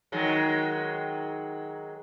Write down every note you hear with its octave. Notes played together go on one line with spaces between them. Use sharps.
D#3 F#3 G#3